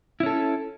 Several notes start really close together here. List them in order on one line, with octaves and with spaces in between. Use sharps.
E4 C#4 A4